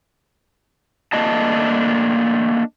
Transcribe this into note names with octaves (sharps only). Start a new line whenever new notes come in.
A3 A#3 D4 D#5 A5